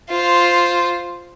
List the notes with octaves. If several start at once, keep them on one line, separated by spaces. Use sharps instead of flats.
F4 C5